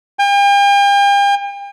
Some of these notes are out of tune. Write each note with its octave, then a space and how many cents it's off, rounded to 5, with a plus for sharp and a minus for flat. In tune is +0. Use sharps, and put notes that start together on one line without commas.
G5 +45